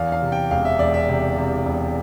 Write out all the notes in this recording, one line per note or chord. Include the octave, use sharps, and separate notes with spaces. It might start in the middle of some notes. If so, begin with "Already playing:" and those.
Already playing: E2 F5
F5
C3
G5
E1 F5
E5
E1 D5
E5
C3
C3
E1